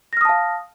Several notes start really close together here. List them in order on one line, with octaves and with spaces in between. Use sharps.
A#6 F6 D#6 A5 F5